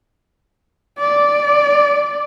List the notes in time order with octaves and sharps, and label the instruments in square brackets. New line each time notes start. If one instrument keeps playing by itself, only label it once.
[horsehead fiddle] D5